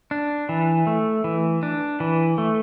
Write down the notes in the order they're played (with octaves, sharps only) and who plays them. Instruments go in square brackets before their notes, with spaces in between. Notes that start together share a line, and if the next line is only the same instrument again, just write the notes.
[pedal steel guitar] D4
E3
A3
E3
D4
E3
A3